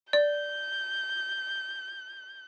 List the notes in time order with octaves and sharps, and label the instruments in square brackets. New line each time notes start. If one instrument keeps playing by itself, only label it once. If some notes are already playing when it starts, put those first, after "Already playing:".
[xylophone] D5 [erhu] G6